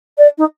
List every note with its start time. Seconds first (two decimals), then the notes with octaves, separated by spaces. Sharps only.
0.18 D5
0.38 D#4